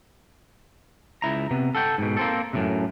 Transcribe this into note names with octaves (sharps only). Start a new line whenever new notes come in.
C#2 E4 A#5
C3 B3
A4 F#5 G5
G#2 B2
A#3 C4 A4
F#2 A2 C3